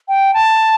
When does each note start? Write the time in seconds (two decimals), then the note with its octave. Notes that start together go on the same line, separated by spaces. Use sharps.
0.08 G5
0.34 A5